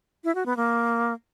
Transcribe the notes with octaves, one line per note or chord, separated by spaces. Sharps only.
E4
F#4
B3
A#3